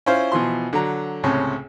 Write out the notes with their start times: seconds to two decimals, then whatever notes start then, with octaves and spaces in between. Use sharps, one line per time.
0.06 C#4 E4 F4 C5 F5
0.32 B2 E3 F3 C6
0.73 D3 F#3 A#5
1.23 C#2 A2 C3 C#4